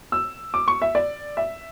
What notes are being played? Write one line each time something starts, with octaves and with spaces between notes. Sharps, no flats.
E6
D6
C#6
E5
D5
E5